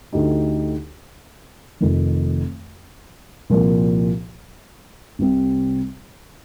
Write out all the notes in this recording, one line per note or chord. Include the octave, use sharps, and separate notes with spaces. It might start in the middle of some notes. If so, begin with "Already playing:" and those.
D2 D3 A3 D#4 G4
F1 F2 D#3
C2 A#2 F3
C2 C3 G3 C4